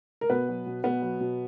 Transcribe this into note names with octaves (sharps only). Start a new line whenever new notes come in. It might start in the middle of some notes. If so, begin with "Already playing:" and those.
A#4
B2 B3 B4
F#3
B2
B2 B3 B4
F#3
B2